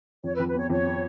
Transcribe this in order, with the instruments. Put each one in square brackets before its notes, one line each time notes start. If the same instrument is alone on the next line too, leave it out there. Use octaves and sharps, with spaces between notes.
[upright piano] F2 [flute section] C#5
[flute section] B4
[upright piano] F2
[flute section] B4
[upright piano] B3 [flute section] C#5
[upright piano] F2 [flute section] C#5
[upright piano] B3